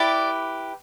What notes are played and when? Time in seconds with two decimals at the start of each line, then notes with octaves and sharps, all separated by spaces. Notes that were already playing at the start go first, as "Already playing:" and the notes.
Already playing: E4 G4 B4 D5